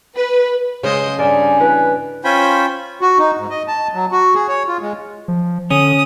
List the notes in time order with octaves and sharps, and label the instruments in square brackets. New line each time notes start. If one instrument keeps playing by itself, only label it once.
[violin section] B4
[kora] C#3 [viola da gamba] G#3 C5 D#5
[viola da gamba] G2 [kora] A#3 E5 [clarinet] D5 [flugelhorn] G#5
[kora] E3 [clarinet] B4
[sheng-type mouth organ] C#4 F4 C5 G5 G#5 B5
[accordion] F#4
D#4
G#2
D#5
A5
F#3
F#4
G#4
C#5
F4
G#3
[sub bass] F3
[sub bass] D3 [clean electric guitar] C#4 [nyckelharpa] D#6